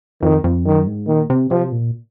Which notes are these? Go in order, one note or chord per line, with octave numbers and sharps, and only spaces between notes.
F2 D#3
F2
F#2 D#3
G#2
A#2 D#3
C3
C3 F3
A#2